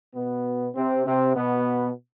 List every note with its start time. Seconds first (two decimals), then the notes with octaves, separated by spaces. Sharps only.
0.15 B2 B3
0.75 C3 C4
1.06 C3 C4
1.36 B2 B3